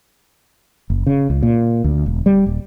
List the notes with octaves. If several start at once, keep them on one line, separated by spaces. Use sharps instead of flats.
F#1
C#3
C#2
A#2
D2
E1
G3
D#1